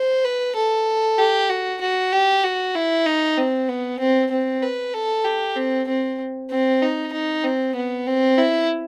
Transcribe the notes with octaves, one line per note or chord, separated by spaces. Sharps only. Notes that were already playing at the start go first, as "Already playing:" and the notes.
Already playing: C5
B4
A4
G4
F#4
F#4
G4
F#4
E4
D#4
C4
B3
C4
C4
B4
A4
G4
C4
C4
C4
D#4
D#4
C4
B3
C4
E4